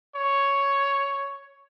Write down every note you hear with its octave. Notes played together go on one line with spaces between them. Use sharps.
C#5